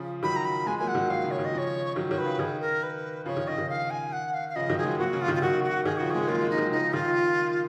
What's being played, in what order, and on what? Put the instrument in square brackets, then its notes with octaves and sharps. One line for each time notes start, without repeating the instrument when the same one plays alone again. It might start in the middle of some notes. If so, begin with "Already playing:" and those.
Already playing: [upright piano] C#3 F3
[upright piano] D#3 F#3 [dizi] B5
[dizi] A#5
B5
[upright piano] F3 G#3 [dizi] G#5
[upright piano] F#3 A#3 [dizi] G#5
[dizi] F#5
[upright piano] D#3 F#3
[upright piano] D#3 [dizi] F5
[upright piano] C#3
[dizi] C#5
[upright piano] D#3
[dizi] D#5
[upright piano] C#3 F3
[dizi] C#5
[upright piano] D#3 F#3
[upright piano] D#3 [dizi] C#5
[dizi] B4
[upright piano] C#3
[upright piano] D#3 [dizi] G#4
[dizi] A#4
B4
[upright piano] C#3 F3 [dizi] C#5
[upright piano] D#3
[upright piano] C#3 [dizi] D#5
[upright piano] D#3
[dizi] F5
G#5
F#5
F5
F5
[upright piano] C#3 F3 [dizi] D#5
[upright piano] D#3 F#3
[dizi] G#4
[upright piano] F3 G#3
[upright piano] F#3 A#3 [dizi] F#4
[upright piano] C#3
[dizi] F4
[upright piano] D#3
[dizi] F4
[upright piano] D#3 F#3 [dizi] F#4
[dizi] F#4
[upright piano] D#3 [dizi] G#4
[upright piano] C#3 F3 [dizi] F#4
[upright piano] F3 G#3 [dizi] G#4
[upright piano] F#3 A#3 [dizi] F4
[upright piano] F3 G#3
[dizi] D#4
[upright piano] D#3 F#3
[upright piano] C#3 F3 [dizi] D#4
[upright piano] D#3 [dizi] F4